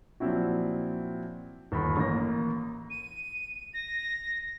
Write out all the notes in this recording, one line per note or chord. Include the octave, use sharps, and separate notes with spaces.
A#2 F3 F#3 C4 E4 F#4
G1 D#2 B5
A1 A#3 A#6
D#7
A#6